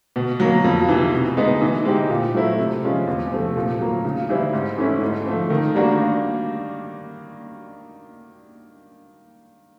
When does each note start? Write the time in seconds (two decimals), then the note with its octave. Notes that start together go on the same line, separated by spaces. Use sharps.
0.16 B2
0.40 F#3 A#3
0.64 F2
0.89 C3 E3
1.13 B2
1.37 G#3 B3 D#4
1.61 E3
1.85 G#3 C4 D#4 G4
2.10 A#2
2.35 F#3 A3 C4 E4
2.59 C3
2.83 F3 G#3 C#4 F4
3.07 E2
3.31 C3 F3 A3
3.56 A#2
3.80 F#3 A#3
4.05 C#3
4.29 E3 G3 C4 E4
4.53 G#2
4.78 E3 A3 C#4 E4
5.01 G#2
5.26 F3 A3 C4
5.50 D#3
5.75 G3 A#3 D4 F#4